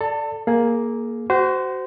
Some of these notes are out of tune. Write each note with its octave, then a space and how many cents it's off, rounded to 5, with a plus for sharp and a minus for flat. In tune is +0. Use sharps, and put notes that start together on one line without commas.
A4 +0 D5 +0 A5 +30
A#3 +5 G#4 +25
F#4 +25 C5 -20